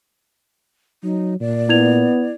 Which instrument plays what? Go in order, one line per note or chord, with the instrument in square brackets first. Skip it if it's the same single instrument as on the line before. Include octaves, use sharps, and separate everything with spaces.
[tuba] F#3 [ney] D#4
[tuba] A#2 [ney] D5
[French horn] B3 [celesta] E4 G#6 F7